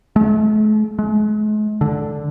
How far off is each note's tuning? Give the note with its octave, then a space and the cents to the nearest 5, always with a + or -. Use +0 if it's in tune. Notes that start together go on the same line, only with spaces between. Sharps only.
A3 -45
G#3 +40
D3 -5